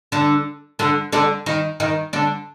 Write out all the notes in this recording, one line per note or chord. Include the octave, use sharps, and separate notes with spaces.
D3 D4
D3 D4
D3 D4
D#3 D#4
D#3 D#4
D3 D4